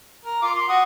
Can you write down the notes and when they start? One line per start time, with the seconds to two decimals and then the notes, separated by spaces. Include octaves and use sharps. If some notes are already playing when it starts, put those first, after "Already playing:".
0.25 A#4
0.42 F4 D6
0.54 C6
0.69 F#4 F#5 D#6